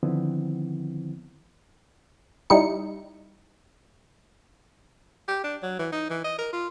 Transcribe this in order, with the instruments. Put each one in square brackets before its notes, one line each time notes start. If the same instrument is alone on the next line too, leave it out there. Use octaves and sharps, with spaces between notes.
[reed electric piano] D3 D#3 F3 B3 C4 E4
[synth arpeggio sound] G3 D#4 E4 C#7
[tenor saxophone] G4
D4
F#3
E3
D#4
E3
D#5
A#4
F4